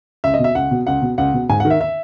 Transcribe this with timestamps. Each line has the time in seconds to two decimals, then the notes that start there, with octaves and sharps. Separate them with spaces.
0.24 C#2 E5
0.34 D#5
0.39 B2 E5
0.55 C#2 F#5
0.71 B2
0.87 C#2 F#5
1.02 B2
1.18 C#2 F#5
1.34 B2
1.49 G#2 G#5
1.60 F#5
1.65 D#3
1.70 E5
1.81 E5